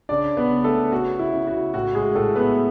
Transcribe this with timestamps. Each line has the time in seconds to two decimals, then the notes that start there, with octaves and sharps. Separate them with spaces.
0.09 C#3 D4 D5
0.37 B3 B4
0.50 C#3
0.64 A3 A4
0.92 C#3 F#4
1.19 E4
1.33 C#3
1.47 F#4
1.74 A2 F#4
1.95 G#3 G#4
2.15 A2 A3 A4
2.36 B3 B4